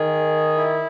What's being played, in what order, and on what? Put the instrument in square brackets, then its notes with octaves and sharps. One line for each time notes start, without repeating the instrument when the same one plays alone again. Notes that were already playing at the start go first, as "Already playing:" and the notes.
Already playing: [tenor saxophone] D#3 [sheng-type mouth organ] G#4
[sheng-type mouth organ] E4